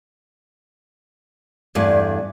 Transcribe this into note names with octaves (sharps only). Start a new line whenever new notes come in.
E2 G2 A3 D5